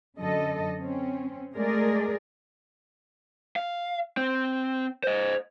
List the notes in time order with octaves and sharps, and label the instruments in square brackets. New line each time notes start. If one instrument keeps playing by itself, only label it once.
[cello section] F#2 D3 A4 D#5
C4 C#4
G#3 A3 G#4 A#4 D5
[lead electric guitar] F5
C4
C5 D#5